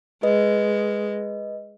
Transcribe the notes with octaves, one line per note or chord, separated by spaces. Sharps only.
G#3 B4 D#5